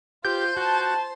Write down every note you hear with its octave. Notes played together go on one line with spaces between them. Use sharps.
F4 G4 C5 C6 G6
F#4 A5